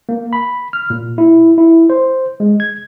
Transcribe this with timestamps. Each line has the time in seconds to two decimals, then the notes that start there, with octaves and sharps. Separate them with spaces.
0.09 A#3
0.33 B5
0.73 F6
0.90 A#2
1.18 E4
1.58 E4
1.90 C5
2.40 G#3
2.60 G#6